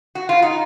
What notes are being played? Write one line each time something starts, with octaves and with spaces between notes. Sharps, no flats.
F#4
F4
D#4